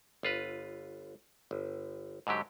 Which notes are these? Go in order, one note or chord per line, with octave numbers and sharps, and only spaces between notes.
G1 F4 B4
G1
G#2 D3 F#3 G4